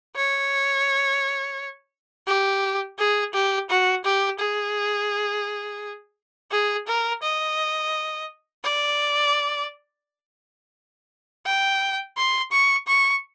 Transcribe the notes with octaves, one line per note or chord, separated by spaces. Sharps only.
C#5
G4
G#4
G4
F#4
G4
G#4
G#4
A#4
D#5
D5
G5
C6
C#6
C#6